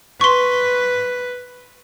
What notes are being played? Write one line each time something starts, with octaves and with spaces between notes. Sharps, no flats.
B4 C6 C#6